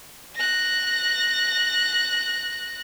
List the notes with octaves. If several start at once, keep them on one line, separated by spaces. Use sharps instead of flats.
F#6 A#6